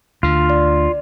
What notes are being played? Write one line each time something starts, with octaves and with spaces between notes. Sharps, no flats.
D2 D3 F4
D5